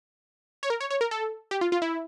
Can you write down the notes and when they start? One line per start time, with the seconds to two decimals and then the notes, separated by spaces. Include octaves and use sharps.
0.63 C#5
0.70 A#4
0.81 C#5
0.91 C#5
1.01 A#4
1.11 A4
1.51 G4
1.61 F4
1.72 F4
1.82 E4